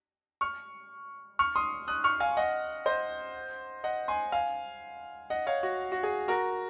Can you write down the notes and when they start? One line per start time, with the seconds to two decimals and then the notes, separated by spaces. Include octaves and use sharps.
0.41 C#6 F6
1.39 C#6 F6
1.55 C6 D#6
1.88 D#6 F#6
2.04 C#6 F6
2.20 F5 G#5
2.37 D#5 F#5
2.86 C5 D#5
3.84 D#5 F#5
4.08 G#5 C6
4.32 F5 G#5
5.30 D#5 F#5
5.47 C#5 F5
5.63 F#4
5.92 F#4
6.03 G#4
6.28 F#4 A#4